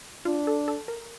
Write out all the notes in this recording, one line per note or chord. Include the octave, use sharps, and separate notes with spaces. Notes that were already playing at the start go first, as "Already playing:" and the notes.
D4 F4
A4
A4
A#4